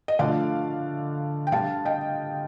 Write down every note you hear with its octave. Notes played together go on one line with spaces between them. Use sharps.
D#5
D3 F3 A3 D5 F5
G5
D3 G3 F5 A5
D#5 G5